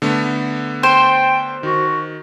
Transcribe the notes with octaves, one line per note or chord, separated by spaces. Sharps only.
D3 A3 B3
C5 G5
D#3 F#4